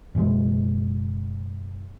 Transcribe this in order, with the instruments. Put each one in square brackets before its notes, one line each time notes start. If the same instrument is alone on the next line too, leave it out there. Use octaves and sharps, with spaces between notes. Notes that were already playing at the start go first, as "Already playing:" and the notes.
[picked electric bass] F#1 B2 E3 G#3